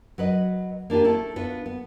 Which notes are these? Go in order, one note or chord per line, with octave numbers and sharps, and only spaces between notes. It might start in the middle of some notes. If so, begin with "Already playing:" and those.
F#3 B4 D#5
A#3 D4 F4 G4
A3 E4 A4
B3 D4 F4 B4
B3